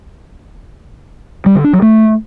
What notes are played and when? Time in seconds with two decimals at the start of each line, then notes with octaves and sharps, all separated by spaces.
1.46 G3
1.55 D3
1.64 D4
1.73 F#3
1.82 A3